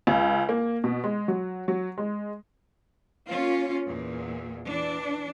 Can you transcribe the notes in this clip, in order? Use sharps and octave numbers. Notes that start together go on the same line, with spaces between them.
C#2
A#3
B2
G#3
F#3
F#3
G#3
A#3 C#4 F4
E2 A#2
E3 D4